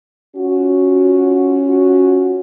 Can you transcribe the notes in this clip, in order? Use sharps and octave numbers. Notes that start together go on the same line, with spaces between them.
C#4 F4 F#4